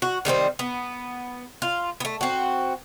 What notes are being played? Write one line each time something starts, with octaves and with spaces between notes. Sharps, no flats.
F#4
D#3 G3 B3 C4
B3
F4
A3 B3
C4 F#4